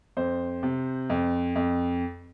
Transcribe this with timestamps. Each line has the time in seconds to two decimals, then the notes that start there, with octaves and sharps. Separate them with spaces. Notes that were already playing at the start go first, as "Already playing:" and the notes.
0.17 F2 C5
0.63 C3
1.10 F2
1.56 F2